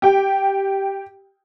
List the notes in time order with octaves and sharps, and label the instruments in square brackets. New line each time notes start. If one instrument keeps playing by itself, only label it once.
[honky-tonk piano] G4 G5